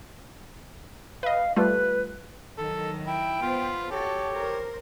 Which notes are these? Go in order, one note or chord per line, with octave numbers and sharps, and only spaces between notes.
B4 D#5 F5
G3 A3 F4 B4
D#3 F#3 A4
E4 G5
B3 F4 C5
F#4 G4 A4 C#5
A#4 C5